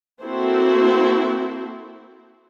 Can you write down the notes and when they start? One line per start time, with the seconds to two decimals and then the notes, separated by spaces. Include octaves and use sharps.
0.22 A#3 C4 E4 F#4 A4 C5